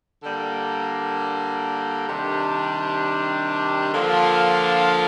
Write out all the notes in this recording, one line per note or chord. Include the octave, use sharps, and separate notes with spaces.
D3 G3 A#3
C3 D#3 G3 D4
D3 F3 A#3 D4 F4